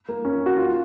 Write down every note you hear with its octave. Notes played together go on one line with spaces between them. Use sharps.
A#3
C#4
F#4
F4